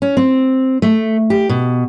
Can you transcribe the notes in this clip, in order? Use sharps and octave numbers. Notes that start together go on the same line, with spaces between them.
C#4
C4
A3
G4
B2